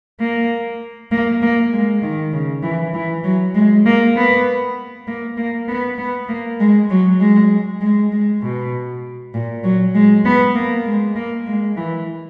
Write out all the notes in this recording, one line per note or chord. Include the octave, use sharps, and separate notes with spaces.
A#3
A#3
A#3
G#3
D#3
C#3
E3
E3
F#3
G#3
A#3
B3
A#3
A#3
B3
B3
A#3
G#3
F#3
G#3
G#3
G#3
B2
A#2
F#3
G#3
B3
A#3
G#3
A#3
G#3
E3